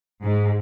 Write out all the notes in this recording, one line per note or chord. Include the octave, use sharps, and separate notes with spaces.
G#2